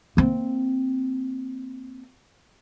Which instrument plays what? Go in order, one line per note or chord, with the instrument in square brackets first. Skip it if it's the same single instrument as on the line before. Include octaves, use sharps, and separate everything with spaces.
[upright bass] A#3 C4